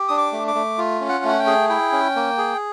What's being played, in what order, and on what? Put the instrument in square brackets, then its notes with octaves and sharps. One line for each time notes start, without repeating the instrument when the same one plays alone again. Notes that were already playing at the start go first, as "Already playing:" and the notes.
Already playing: [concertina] G4
D4 D#6
D6
A3
D6
A3
F4
C#4
F#5
A3 F#5
G5
G#4
E4 G5
C#4
A#3
G#4